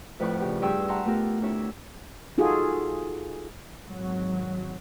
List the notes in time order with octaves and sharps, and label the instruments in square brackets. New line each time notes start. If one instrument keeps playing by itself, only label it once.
[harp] F2 A2 B4 D5 F#5 C#6
C#3 G4 B4
G2 G3 G#4 G5 C#6 E6
E5 F#5 G5 A5 A#5 C6
A3 B3 F4 G4 A4 A#4
D2 D4 E4 G4 C#5 E5
[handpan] D#4 F4 F#4 G#4 A4
[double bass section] G#1 F#3